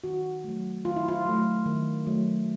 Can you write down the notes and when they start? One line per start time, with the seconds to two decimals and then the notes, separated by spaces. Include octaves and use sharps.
0.04 D#3 F#4
0.44 F#3 A3
0.85 D#3 F4
0.96 E4
1.08 F4
1.25 F#3 A3
1.66 D#3
2.07 F#3 A3